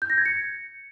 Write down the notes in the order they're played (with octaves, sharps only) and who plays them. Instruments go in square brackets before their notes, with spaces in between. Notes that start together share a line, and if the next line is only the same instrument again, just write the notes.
[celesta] G6
A#6
G#6
C#7